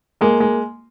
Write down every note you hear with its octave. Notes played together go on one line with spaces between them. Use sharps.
G#3 A#3
G#3